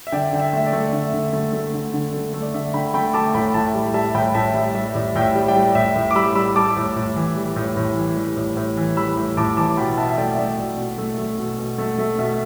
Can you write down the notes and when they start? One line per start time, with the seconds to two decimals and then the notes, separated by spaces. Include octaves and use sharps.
0.07 E5
0.12 D3 D5 G5
0.33 D3 G5
0.40 E5
0.53 A3 E5
0.66 D5
0.73 A3
0.93 D3 E5
1.13 D3
1.33 A3
1.53 A3
1.74 D3
1.94 D3
2.14 A3
2.33 A3
2.42 D5
2.54 D3 E5
2.74 D3 G5 B5
2.94 A3 G5 B5
3.14 A3 A5 D6
3.34 A2 G5 B5
3.54 A2 E5 A5
3.74 G3
3.94 G3 E5 A5
4.15 A2 G5 B5
4.34 A2 E5 A5
4.55 G3 E5
4.75 G3 E5
4.95 A2 D5
5.15 A2 G5
5.22 E5
5.35 G3
5.48 D5 G5
5.55 G3
5.75 A2 E5
5.96 A2
6.11 D6
6.15 G3 B5 E6
6.36 G3 B5 E6
6.56 G3 A5 D6
6.76 A2
6.96 A2
7.16 E3
7.36 G3
7.56 A2
7.77 A2
7.96 E3
8.16 G3
8.37 A2
8.57 A2
8.77 E3
8.97 G3 B5 E6
9.17 A2
9.37 A2 A5 D6
9.57 E3 A5 D6
9.77 B2 G5 B5
9.97 B2 E5 A5
10.08 E5
10.17 A3 D5 G5
10.38 A3 D5
10.58 B2
10.77 B2
10.98 A3
11.18 A3
11.38 B2
11.58 B2
11.78 A3
11.99 A3
12.19 B2 E5